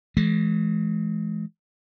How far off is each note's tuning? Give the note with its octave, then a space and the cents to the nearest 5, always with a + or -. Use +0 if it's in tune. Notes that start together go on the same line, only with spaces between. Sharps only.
E3 +15 G#3 +30